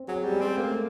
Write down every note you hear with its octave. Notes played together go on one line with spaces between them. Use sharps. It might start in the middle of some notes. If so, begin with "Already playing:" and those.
Already playing: C4
F#3 G#4
G3
G#3
C4
A3 A#3